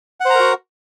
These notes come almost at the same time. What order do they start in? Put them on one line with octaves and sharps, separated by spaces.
F#5 C5 A#5 A#4 F#4